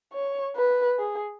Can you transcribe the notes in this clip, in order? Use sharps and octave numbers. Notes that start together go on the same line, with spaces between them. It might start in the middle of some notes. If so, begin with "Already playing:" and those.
C#5
B4
G#4